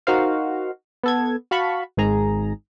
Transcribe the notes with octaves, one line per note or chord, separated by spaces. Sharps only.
D#4 F#4 A#4 C5 F5
B3 A4 G#6
F#4 F5 A5 B5 C#6
G#1 G#2 G#4 A#5